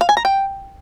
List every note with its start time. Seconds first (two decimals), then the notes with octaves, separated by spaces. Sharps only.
0.01 F5
0.09 G#5
0.17 A#5
0.25 G5